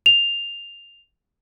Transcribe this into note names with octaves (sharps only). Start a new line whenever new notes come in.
F7